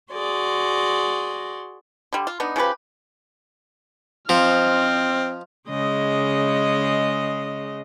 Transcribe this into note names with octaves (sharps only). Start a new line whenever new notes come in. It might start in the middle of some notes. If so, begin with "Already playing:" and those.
F#4 G#4 D5 C6
D3 G3
F4
B3 D4 D#4
C#3 F3 G4 B4
F3 C4 D#5 F6
C#3 G#3 D#5